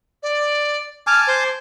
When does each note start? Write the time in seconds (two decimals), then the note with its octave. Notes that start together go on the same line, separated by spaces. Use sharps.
0.23 D5
1.07 G#5 A5 D6 F6
1.27 C5